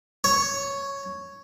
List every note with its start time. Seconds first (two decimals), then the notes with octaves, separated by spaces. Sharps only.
0.24 C#5